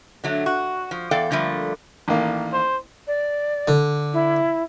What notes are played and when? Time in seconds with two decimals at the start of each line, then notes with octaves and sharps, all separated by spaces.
0.24 D3 F#3 A3
0.46 F#4
0.91 F3
1.11 E2 A4 D5 F5 G5
1.31 D3 F3 G3 A3 A#3
2.08 A1 D#3 A#3
2.53 C5
3.07 D5
3.68 D3
4.13 E4